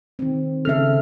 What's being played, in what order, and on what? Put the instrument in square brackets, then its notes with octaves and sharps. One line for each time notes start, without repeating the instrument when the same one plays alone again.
[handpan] D#3 C4
[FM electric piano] C#3 F6 [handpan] A4 E5